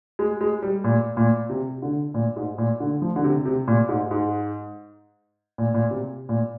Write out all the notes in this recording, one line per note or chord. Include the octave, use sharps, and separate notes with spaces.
G#3
G#3
G3
A#2
A#2
C3
D3
A#2
G#2
A#2
D3
F3
D3
C3
C3
A#2
G#2
G#2
A#2
A#2
C3
A#2